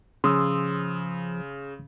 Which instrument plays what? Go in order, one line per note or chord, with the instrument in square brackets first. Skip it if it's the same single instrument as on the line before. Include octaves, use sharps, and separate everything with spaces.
[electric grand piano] C#3 [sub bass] F3 [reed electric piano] C6 D#6 E6